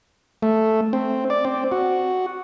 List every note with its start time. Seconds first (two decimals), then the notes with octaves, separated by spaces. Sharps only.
0.43 A3
0.93 C4
1.30 D5
1.45 C4
1.72 F#4